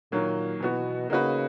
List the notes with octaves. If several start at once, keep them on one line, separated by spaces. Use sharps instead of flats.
A#2 D#3 F#3 A#3
B2 E3 B3 F#4
C#3 A#3 D#4 F#4 B4